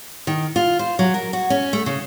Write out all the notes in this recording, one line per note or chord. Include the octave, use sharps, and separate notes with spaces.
D#3
F4
C5
F#3
A#4
F#4
C#4
A3
C#3